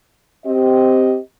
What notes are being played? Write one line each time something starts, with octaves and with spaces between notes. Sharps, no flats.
C4 G4 D#5